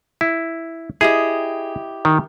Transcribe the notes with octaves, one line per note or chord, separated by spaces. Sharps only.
E4
E4 G4 G#4 D#5
D#3